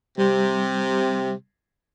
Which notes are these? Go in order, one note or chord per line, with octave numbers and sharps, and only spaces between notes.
C3 G3